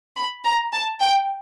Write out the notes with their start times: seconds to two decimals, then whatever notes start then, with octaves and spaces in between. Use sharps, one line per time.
0.17 B5
0.45 A#5
0.73 A5
1.01 G5